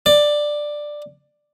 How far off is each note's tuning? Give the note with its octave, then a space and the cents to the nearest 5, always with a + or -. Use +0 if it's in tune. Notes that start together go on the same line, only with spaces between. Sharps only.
D5 +10